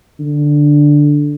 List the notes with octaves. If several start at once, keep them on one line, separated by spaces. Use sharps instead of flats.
D3